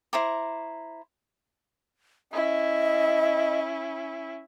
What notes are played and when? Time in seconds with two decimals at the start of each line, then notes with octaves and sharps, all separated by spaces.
0.13 E4 C5 A#5 D6
2.33 C#4 E4 D#5